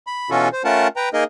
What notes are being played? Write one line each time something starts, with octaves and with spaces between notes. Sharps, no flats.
B5
B2 E3 C#4 F4 F#4 A4
C5
A3 C#4 F4 A#4 F#5 A5
B4 G5 A#5
A#3 D#4 G#4 A#4 D#5